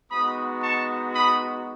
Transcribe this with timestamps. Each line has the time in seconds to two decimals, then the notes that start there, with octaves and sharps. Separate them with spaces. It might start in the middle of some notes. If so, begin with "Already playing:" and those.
0.10 G#3 B3 D#4 F#4 B5 D#6
0.62 A5 C#6
1.14 B5 D#6